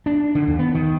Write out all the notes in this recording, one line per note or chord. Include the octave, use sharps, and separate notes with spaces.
D4
D3
D#2
B3
D#3